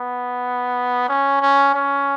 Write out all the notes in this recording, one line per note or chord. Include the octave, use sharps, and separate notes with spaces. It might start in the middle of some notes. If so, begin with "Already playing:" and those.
Already playing: B3
C#4
C#4
C#4